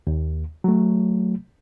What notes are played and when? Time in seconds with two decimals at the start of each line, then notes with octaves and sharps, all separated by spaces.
0.07 D#2
0.64 F#3 A3